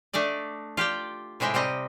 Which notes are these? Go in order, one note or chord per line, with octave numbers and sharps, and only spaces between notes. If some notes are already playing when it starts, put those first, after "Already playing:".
A3 D4 D5 D#5
F4 G4 D5 G5
A2 C3 G#3 E5 G5
C3 G3 C4 D#5